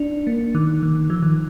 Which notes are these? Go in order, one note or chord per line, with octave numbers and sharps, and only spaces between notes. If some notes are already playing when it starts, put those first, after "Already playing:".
Already playing: D4
A#3
D#3
D#3
F3
D#3